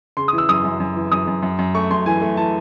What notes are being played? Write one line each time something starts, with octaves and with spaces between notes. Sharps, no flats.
C#3 C6
E3 D#6
E6
F#2 D#6
F#2
F#2
E3
F#2 D#6
F#2
F#2
F#2
A3 C#6
F#2 C6
E3 G#5
A3
E3 A5